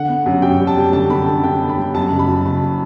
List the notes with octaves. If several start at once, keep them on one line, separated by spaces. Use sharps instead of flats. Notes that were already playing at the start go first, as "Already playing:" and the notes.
Already playing: D3 F#5
B3
F#2
F#2 G5
G3
A5
G3
D3 A5
D3 B5
D3 A5
D3 G5
B3
B5
G3
F#2 A5
F#1
B5
F#3
F#1 A5